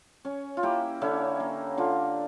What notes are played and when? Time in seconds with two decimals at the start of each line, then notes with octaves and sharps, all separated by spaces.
0.25 C#4
0.57 F4
0.63 A#3 E4 G4
1.01 D3 C#4 E4
1.40 A#3
1.78 D3 D4 F4